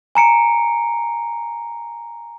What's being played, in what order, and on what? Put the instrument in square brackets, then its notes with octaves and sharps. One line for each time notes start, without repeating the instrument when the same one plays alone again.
[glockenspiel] G#5 A#5 C#7 D7